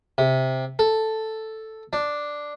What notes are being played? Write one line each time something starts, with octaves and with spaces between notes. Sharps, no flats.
C3
A4
D4